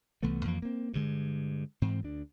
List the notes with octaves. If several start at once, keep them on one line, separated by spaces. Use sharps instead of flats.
C2 E3 A3 B3
F2 E3 F3 A#3
A#3 C4
G2 D3 G#3
G#2 E3 C4
D2 D4